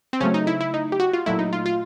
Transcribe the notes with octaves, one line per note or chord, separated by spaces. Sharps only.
C4
C#3 F#3 A3 C#4
D#4
E4
E4
D#4
G4
F#4
F4
A#2 F#3 A3 E4
D#4
F4
F4